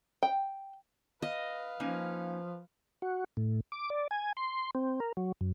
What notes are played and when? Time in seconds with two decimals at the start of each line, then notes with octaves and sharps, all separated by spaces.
0.23 G5
1.22 B4 D#5 F5
1.80 F3 A#3 C#4 D#4
3.02 F#4
3.37 A2
3.72 D6
3.90 D5
4.11 G#5
4.37 C6
4.75 C4
5.00 A#4
5.17 F#3
5.41 F#2